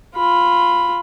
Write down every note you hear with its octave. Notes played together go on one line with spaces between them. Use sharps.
F4 B5